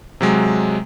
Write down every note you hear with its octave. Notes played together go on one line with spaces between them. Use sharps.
C3 F#3 G#3